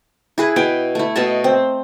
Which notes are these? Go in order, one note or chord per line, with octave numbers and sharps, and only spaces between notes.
E4 G#4 B4
B2 E4 G5
A3 E4
B2 A3 D#5 A5
C4